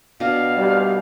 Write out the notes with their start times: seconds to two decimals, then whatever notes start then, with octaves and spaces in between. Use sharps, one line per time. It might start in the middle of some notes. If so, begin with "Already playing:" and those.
0.20 B2 D4 F5
0.57 G3 D5